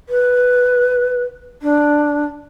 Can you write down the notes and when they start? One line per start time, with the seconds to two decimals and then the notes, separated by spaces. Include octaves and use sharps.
0.09 B4
1.62 D4